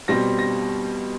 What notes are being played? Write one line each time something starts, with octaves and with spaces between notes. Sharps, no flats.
B2 G3 C4 A#6
A#6